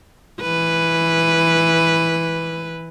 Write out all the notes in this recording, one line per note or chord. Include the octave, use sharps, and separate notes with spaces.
E3 B4